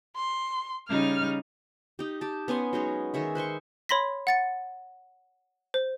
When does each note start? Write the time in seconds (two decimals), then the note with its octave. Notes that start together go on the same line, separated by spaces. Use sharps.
0.16 C6
0.89 C#3 G3 D#4 F6
1.99 D#4 G4
2.21 G4 A5
2.48 B3 C#4 G#5 C6
2.73 F#3 G#3 D#4 C#5
3.14 D#3 G#4 C#5 E5
3.35 B4 C5 C6 C#6
3.89 C#5 B5 C6 A#6 B6
4.27 F#5 A6 C#7
5.74 C5